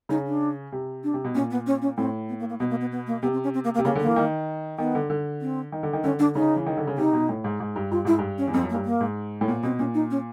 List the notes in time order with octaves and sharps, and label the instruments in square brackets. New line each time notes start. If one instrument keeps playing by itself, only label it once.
[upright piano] C#3 [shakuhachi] D#4
[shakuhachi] D4
[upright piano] C3
[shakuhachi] D4
[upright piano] C3
B2
[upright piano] A#2 [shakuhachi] C#4
[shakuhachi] B3
C#4
C#4
[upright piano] A2 [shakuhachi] C4
[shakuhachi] B3
A#3
A#3
[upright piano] B2 [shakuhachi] B3
[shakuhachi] A#3
B3
B3
A#3
[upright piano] C3 [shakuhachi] B3
[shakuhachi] C4
C#4
C4
A#3
A#3
[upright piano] C3
[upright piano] C#3 [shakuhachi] A#3
[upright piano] D3
[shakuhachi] A#3
[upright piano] E3
D#3
[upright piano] D#3 [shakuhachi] B3
[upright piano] D3
D3
[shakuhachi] C4
[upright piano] D#3
D3
D#3
[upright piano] D3 [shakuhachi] C#4
[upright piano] D3 [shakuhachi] D4
[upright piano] C#3 [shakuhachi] D#4
[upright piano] E3
D#3
D3
C#3
[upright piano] C3 [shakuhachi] D#4
[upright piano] B2
A2
G#2
G#2
G2
[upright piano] G2 [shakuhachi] F4
[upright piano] G#2 [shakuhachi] E4
[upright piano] G2
[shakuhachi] C#4
[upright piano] E2
[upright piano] F2 [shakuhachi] C4
[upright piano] F#2
[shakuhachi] A#3
[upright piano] G2
[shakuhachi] A#3
[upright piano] G#2
A2
[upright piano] A#2 [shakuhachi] B3
[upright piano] B2 [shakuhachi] C4
[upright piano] A#2 [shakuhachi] C#4
[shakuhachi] D#4
C#4